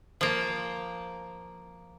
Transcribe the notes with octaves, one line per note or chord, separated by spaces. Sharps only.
F3 A#3